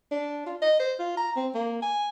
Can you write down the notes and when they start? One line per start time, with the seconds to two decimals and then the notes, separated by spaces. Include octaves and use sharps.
0.11 D4
0.46 F4
0.62 D#5
0.79 C5
0.99 F4
1.17 A#5
1.36 C4
1.55 A#3
1.82 G#5